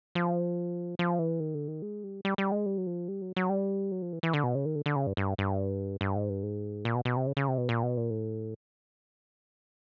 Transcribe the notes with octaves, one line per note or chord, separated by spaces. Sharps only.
F3
F3
E3
D#3
D3
D#3
G#3
G3
G3
G3
G#3
G3
F#3
F3
G3
F#3
F#3
G3
F#3
F3
E3
E3
D3
B2
C#3
D#3
D3
D3
C#3
G2
G2
G2
G2
G#2
G2
G#2
A#2
B2
B2
C3
C#3
C#3
C3
B2
A#2
B2
A#2
A2